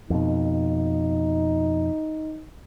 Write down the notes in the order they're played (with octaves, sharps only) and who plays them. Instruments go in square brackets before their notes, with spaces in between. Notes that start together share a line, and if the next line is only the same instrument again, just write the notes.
[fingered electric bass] F2 B2 [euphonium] D#4